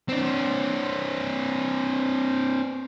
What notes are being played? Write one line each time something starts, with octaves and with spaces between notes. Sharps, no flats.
C4 D4